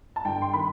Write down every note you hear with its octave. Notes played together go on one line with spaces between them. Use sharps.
A5
G1 G5
C6
D#3 B5